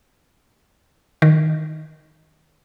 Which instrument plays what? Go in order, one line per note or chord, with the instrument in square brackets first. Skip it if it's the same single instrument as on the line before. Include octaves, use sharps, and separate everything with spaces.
[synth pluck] D#3